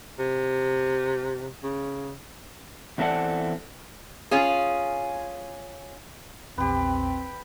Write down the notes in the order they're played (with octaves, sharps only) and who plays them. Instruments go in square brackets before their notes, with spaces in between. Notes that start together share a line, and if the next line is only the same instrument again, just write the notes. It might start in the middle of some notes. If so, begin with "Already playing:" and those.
[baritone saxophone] C3
C#3
[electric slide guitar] E2 E3 C4 A4 D5 F#5
[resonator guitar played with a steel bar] C#4 F4 G#4
[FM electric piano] A#1 E2 [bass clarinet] C4 [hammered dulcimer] G4 B4